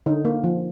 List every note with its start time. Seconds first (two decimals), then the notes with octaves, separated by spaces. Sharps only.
0.06 D3 D#4
0.25 A#3
0.44 F3